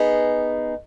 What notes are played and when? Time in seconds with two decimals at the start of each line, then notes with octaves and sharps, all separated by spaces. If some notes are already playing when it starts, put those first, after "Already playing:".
Already playing: B3 D#4 G#4